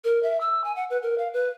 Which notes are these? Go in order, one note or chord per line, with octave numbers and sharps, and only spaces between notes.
A#4
E5
E6
G#5
F#5
B4
A#4
F5
B4